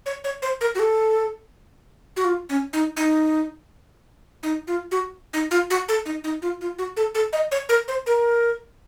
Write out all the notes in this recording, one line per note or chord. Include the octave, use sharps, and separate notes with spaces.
C#5
C#5
C5
A#4
F#4
A4
F#4
F4
C#4
D#4
D#4
D#4
F4
F#4
D#4
F4
F#4
A4
D#4
D#4
F4
F4
F#4
A4
A4
D#5
C#5
A#4
C5
A#4